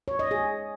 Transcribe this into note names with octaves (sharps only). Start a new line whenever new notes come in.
C#5
D#5
G#4